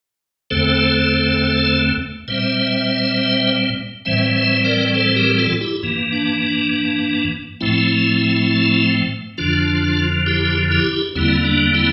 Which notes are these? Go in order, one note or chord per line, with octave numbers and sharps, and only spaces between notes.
E2 D3 A3 C4 A4 C5
A#2 G3 C4 C5 E5
A2 E3 G3 C4 C5 E5
C5 E5
A#4 D5
A4 C5
G4 A#4
F4 A4
E4 G4
G2 E3 A#3
D4
D4
A2 F3 A3 C4 E4
F2 D3 F3 D4 F4
E4 G4
E4 G4
E2 D3 G3 A#3 C4 E4
D4
C4 E4